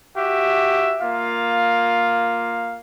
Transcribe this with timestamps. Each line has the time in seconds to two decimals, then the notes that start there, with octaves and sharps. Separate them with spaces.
0.16 F#4 G4 E5
1.02 A#3 F4 F5